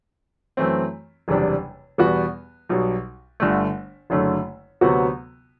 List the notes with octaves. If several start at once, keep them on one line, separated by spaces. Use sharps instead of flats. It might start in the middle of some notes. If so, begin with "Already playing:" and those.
F#2 E3 A3 C4
F#1 E2 C3 G3 D4
E2 B2 G3 B3 F#4
B1 B2 G3
G1 G2 D3 A3
F#1 F#2 D3 A3
D2 C3 F#3 B3 F#4